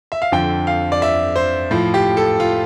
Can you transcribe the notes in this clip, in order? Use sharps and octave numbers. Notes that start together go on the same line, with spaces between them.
E5
F5
F2 D3 F3 G5
F5
D5
E5
C5
A2 F3
G4
A4
F4